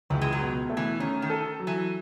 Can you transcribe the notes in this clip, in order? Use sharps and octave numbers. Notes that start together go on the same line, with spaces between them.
C#2 E3
G#3
F#3
B2
A3
E3
D#3 C#4
D#3
A4
F#3
E3